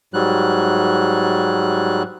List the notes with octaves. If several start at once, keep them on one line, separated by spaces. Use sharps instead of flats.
G#2 F#3 G3 F#6